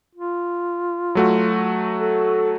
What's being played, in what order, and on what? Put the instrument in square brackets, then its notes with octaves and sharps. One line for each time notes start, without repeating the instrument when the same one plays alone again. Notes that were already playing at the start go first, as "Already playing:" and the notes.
[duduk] F4
[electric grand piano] F#3 A3 F#4
[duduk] A4